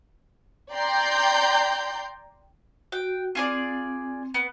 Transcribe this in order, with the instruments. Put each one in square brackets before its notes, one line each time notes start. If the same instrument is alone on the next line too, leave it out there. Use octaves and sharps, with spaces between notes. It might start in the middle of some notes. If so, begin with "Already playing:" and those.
[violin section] D5 G5 A#5 C6 G6
[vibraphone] F#4 [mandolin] G5
[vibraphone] C4 [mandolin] F4 G#4 D5
[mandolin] B3